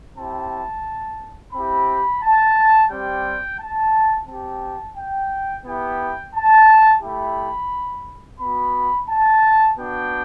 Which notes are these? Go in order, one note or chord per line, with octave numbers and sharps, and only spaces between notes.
C4 E4 G4 A5
C4 E4 G4 B5
A5
G3 C4 G4 G5
A5
C4 G4 A5
G5
B3 E4 G4 G5
A5
A3 E4 G4 B5
B3 F#4 B5
A5
B3 D4 F#4 G5